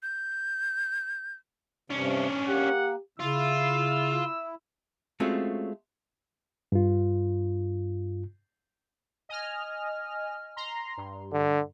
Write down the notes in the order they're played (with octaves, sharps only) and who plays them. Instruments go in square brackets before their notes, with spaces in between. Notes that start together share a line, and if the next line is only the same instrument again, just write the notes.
[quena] G6
[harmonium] G2 C3 [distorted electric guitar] C#4 D4
[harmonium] A#3 [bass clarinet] G4 [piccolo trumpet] F#5
[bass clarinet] C#3 [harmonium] E4 [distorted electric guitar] F4 [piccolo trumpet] E6
[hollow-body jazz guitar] G#3 A3 C4 C#4 F4 F#4
[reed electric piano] G2 F4
[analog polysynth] D#5 G#5 F6
A#5 C6
G2
[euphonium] D3